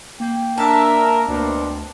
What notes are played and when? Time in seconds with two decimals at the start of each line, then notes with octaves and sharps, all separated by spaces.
0.20 A#3 G5
0.58 D4 A#4 E5 A5
1.28 D2 B2 C4 D4